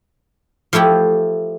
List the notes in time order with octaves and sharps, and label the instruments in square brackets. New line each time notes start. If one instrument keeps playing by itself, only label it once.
[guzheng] F3 A3 E4 G4